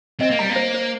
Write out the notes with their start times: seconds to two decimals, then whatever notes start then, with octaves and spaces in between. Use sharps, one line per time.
0.20 C4 D#5
0.30 A#3
0.39 G3 A#5
0.50 A#3
0.56 C5
0.74 C5